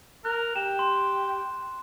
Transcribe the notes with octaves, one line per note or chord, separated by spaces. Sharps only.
A#4 F#6
G4 E7
C6